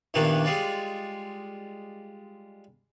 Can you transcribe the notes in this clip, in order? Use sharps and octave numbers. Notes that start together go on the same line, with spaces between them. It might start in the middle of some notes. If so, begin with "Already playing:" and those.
E2 G2 A#2 D#3 A#3 D4
G3 G#3 F4 D5